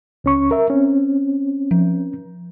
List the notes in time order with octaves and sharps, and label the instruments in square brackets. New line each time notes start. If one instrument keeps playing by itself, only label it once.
[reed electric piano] C#2 C#4 C#6
A#4 E5
C4 C#4
[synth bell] F3